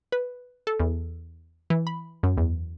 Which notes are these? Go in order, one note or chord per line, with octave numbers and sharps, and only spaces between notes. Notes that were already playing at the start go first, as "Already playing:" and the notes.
B4
A4
E2
E3
B5
F#2
E2